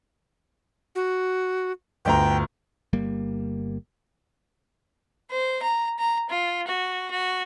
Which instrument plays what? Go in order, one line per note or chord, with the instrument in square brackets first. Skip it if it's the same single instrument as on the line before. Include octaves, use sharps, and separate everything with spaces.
[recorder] F#4
[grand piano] G1 D2 A#5 [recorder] G5
[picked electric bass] G1 G3 A#3
[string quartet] C5
A#5
A#5
F4
F#4
F#4